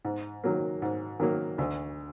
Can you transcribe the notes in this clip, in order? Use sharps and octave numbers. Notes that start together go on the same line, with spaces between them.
G#2
D#3 F#3 A#3
G#2
D#3 F#3 A#3
D2